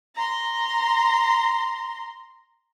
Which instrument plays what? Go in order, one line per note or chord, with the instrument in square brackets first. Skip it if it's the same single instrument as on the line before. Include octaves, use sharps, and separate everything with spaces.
[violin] A#5 C6